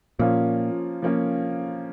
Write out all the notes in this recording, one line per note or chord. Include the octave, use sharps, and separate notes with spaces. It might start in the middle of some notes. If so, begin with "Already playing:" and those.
A#2 F3 A#3 C#4 F4
F3 A#3 C#4 F4